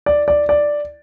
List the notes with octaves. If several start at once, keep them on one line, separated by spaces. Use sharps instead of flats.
D5
D5
D5